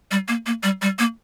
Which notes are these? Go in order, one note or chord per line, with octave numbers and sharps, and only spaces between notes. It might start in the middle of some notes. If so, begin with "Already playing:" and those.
G3
A#3
A#3
G3
G3
A#3